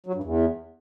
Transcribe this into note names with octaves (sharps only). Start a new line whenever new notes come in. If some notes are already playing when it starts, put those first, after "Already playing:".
F#3
G2
E2